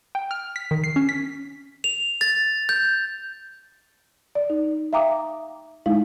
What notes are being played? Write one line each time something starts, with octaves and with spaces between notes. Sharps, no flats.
G5
F6
B6
D#3
C7
C#4
B6
F7
A6
G6
D5
D#4
E5 F5 G5 A#5 D6 D#6
G#3 D#4 E4 F5